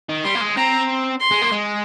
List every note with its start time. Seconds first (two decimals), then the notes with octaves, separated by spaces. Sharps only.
0.09 D#3
0.24 G3 C6
0.35 A#3
0.41 G#3
0.57 C4 A#5
1.20 C6
1.31 G#3
1.41 A#3
1.52 G#3